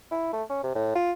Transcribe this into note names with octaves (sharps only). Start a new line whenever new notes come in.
E4
A3
C#4
C3
A2
F4